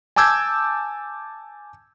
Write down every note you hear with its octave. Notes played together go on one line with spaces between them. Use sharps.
G#5 A5 D6 E6 G6 G#6